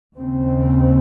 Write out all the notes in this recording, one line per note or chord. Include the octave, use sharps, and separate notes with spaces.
D#2 C#3 C4